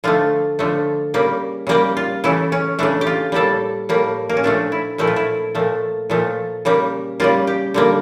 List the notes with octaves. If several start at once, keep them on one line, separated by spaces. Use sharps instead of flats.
D3 F3 A3 F4
D3 F3 A3
C#3 G3 A#3
C#3 G3 A#3 G4
F4
C#3 E3 A3 E4
C#4
C#3 E3 A3 D4
G4
F4
A2 G3 A#3 A4
A2 G3 A#3
A#3
C#4
A#2 F3 A3 D4
E4
A#2 F3 A3 E4
F4
E4
A#2 F3 A3
A#2 F3 A3
C#3 G3 A#3
C#3 G3 A#3 F4
G4
D3 G3 A#3